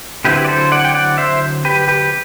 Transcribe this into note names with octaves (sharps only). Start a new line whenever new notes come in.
D3 F#3 C4 E4 G4 B4
D5
A4 C5
D5 F#5
G5
D5 F#5
C5 E5
G4 B4
G4 B4